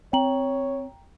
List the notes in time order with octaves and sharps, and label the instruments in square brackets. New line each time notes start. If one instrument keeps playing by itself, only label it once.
[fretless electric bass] C4 [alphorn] C#5 [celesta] G5 A#5 F#7